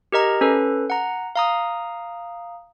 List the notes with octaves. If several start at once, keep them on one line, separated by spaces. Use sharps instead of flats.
G4 A#4 D#5 A#5
C#4 A4 B4
F#5 A#5
F5 A#5 D#6